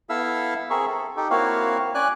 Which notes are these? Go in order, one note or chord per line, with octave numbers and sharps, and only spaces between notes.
B3 E4 A4 E5 F5 E6
C4 G#4 A#4 E5 C#6
A4
D#4 G4 A4
A#3 C4 E4 F#4 C#5 F5
C#4 D5 G#5 F#6